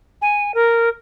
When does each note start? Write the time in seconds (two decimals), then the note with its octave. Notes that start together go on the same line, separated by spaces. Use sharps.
0.22 G#5
0.54 A#4